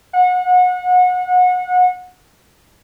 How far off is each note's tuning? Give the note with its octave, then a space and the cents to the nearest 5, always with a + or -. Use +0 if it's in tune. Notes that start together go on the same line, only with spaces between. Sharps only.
F#5 -30